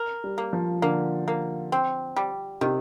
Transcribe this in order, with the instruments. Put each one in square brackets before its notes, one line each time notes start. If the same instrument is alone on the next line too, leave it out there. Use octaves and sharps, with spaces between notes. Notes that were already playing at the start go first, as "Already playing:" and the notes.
Already playing: [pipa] A#4
[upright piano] G3
[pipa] A#3
[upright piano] F3
[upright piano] D3 [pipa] A#3
[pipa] A#3
C4
G3
[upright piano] C3 [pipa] D#3